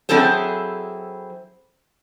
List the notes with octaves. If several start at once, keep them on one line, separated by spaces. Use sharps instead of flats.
F#3 C4 E4 G#4 A4 C5